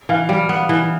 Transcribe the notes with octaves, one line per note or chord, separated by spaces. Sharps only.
E3 F5
G3
B3
E3